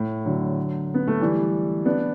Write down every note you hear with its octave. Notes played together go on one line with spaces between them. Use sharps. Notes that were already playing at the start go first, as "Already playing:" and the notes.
Already playing: A2
D3 F#3
B3
A3
E3 G3
B3 D4